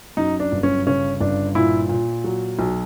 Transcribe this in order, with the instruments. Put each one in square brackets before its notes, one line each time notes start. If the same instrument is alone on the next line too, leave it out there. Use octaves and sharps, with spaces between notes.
[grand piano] F#2 D#4
D4
G1
C#4
C#3 C#4
G1 D4
A#2 E4
A#2
F#3
B1